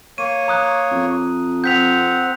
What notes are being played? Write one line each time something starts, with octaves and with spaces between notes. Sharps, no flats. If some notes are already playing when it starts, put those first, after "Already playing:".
A#3 C#5 D#7
A#5 D#6 F#6
F2
C4 F#5 G6 B6 F7